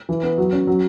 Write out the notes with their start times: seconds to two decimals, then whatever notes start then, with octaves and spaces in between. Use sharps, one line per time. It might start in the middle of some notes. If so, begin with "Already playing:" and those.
0.09 E3
0.23 B3
0.38 F#3
0.53 C#4
0.67 F#3